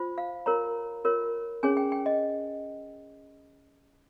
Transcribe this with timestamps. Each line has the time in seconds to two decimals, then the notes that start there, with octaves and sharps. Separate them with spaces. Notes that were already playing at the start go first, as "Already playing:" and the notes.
Already playing: F4 C5
0.18 F5
0.46 F4 A#4 C#5 A#5
1.05 F4 A#4 C#5
1.63 C#4 G#4 C#5 G#5
1.77 G5
1.92 G5
2.06 D#5